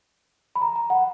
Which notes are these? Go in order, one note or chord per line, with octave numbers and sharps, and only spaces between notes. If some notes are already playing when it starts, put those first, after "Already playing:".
B5
A#5
A#5
F#5